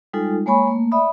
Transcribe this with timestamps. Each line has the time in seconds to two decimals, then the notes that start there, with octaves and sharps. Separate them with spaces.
0.13 G3 G#3 D#4 F4 A4
0.46 G#3 A#3 C#5 G#5 B5 C#6
0.67 A3 A#3
0.91 D5 E5 B5 D#6